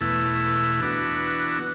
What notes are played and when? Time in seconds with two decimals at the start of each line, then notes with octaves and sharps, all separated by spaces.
0.01 E2 B2 A3 E4
0.80 E3 B3 D4 F#4